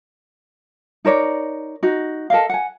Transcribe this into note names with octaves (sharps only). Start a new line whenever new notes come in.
D#4 A#4 C#5 D5
D#4 F#4
A4 A#4 D#5 F5
F#5 G#5